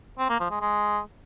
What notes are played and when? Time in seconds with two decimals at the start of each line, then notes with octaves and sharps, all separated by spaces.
0.19 C4
0.29 A#3
0.40 F3
0.50 G#3
0.61 G#3